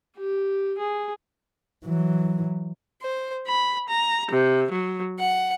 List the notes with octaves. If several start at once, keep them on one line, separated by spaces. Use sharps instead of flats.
G4
G#4
E3 F#3
C5
B5
A#5
C3
F#3
F#5